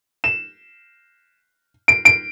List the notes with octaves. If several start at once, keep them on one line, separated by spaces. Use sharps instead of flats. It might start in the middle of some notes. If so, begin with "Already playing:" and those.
E7
D7
D7